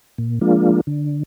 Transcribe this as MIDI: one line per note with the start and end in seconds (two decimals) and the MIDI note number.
0.18 0.39 46
0.41 0.81 53
0.41 0.81 56
0.41 0.81 58
0.41 0.81 62
0.41 0.81 65
0.87 1.23 50